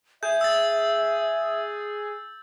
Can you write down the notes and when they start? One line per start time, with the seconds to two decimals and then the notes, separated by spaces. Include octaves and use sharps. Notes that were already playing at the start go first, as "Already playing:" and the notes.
0.23 G#4 E5 G6
0.41 E6 A6